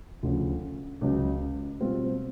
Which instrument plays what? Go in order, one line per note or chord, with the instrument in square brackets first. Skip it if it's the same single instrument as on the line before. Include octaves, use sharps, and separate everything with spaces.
[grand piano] D2 C#3 F3
C#2 C#3 F#3
B2 G3 C4 F4